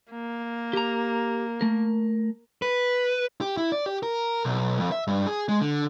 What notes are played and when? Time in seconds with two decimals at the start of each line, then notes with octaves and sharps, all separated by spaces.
0.11 A#3
0.73 G4 A#5
1.61 A3 A#4
2.62 B4
3.41 G4
3.57 E4
3.72 D5
3.86 G4
4.03 A#4
4.45 B1
4.80 F2
4.92 E5
5.07 G2
5.27 G#4
5.49 G#3
5.61 D3